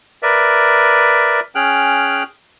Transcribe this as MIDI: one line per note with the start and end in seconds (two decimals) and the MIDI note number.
0.23 1.40 70
0.23 1.40 71
0.23 1.40 74
0.23 1.40 76
1.55 2.23 61
1.55 2.23 68
1.55 2.23 79
1.55 2.23 89
1.55 2.23 90